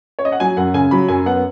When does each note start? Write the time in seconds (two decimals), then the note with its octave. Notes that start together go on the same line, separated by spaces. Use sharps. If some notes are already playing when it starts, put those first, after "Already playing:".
0.19 C#5
0.25 D#5
0.32 F#5
0.40 F#3 G#5
0.57 F#2 F#5
0.74 C#3 G#5
0.91 F#3 B5
1.08 F#2 G#5
1.26 B3 F#5